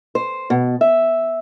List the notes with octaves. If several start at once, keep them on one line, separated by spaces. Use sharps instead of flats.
C5
B2
E5